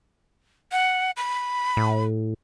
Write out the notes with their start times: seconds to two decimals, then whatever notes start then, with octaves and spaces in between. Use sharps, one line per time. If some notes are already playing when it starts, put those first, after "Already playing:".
0.72 F#5
1.17 B5
1.77 A2